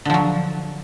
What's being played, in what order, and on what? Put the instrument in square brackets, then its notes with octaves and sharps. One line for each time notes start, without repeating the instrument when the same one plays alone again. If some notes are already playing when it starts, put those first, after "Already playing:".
[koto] D3
F3
F#3